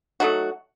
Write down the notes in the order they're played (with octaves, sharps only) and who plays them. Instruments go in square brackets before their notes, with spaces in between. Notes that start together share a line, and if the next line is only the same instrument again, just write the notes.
[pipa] F#3 A3 D#4 F#4